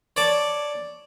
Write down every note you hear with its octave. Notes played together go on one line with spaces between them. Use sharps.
C#5 D5 A5